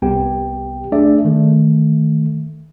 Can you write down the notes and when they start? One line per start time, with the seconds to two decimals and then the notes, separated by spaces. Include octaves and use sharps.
0.02 C2 B3 G4 G5
0.92 A3 D4 G#4 D5 E5
1.25 D#3 A3